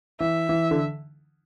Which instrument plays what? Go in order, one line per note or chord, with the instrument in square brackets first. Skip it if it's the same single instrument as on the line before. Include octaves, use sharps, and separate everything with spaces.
[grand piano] E3 [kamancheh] E5
[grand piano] E3
D3